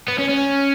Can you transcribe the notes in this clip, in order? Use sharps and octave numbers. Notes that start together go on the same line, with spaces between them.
B3
C#4
C#4